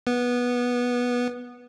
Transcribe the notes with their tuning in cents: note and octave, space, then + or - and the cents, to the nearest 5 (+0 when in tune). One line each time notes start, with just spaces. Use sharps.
B3 -15